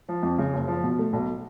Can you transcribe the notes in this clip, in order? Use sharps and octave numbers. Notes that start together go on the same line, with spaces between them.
F3
F2
C#3
F#1
F3
B2
A3
B1